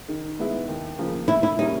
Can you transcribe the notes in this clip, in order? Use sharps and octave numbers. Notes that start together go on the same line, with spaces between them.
D#3
G#3 B3 E4
D#2
C#3 F3 A#3
D#3 E4
E4
G3 A#3 C#4 D#4